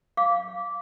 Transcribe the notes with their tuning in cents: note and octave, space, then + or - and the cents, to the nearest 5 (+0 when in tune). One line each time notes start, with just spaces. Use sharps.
F5 -5 D6 -15